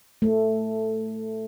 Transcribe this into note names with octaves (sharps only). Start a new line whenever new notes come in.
A3